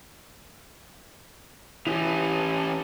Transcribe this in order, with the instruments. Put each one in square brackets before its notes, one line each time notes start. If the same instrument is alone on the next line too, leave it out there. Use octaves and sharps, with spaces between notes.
[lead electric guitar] E3 C#4 [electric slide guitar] E4 G4